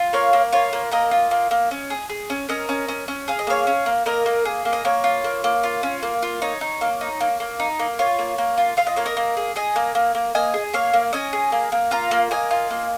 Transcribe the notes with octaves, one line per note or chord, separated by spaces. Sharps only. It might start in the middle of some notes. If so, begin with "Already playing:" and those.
Already playing: F4
A#3 C#5 F5
A#3
F4 C#5
A#3
A#3 A#4 D#5
F4
A#3
A#3
C#4
G#4
G#4
C#4
C#4 A#4 D#5
C#4
C#4
C#4
G#4 F5
D#5
A#3 C#5 F5
C#4
A#3
A#3 A#4 D#5
A#3
G#4
A#3
D#5
A#3 C#5
F4
A#3
A#3
F4
C#4
A#3
F4
D#4 C#5
D#4
A#3
D#4
A#3
A#3
D#4
A#3
F4 C#5
A#3
A#3
F4
F4 F5
D#5
A#3 C#5
A#4 D#5
A#3
G#4
G#4 D#5 G#5
A#3
A#3
A#3
A#3 D#5 G#5
G#4
A#3 C#5 F5
A#3
C#4 D#5 G#5
G#4
A#3
A#3
F4 F5 A#5
A#3
A#3 D#5 G#5
F4
A#3